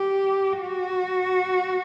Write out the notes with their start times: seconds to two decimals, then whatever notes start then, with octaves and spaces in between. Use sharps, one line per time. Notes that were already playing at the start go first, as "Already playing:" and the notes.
Already playing: G4
0.62 F#4